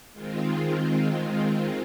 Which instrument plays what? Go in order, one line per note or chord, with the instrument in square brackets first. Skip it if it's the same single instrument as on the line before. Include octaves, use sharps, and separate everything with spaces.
[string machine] D#3 G#3 C4 F4